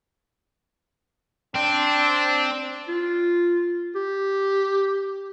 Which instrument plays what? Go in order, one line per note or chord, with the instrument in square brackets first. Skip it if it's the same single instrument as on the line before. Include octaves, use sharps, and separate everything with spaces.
[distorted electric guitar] C4 [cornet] D4
[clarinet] F4
G4